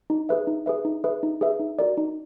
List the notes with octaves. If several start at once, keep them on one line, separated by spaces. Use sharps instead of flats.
D#4
G#4 B4 E5
D#4
G#4 B4 E5
D#4
G#4 B4 E5
D#4
G#4 B4 E5
D#4
F#4 A#4 D5
D#4